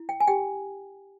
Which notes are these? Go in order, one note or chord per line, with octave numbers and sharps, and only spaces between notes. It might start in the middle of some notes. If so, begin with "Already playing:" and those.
Already playing: E4
G5
G#5
G4 G5